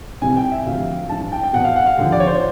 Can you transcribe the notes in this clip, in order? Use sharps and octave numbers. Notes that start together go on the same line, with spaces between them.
C2 C3 E3 G#5
G5
E5
D2 C3 F3 F5
G2 E3 A5
G5
G5
E2 B2 F#5
F5
F#5
F5
D#2 D3 F3
D5
C#5
C5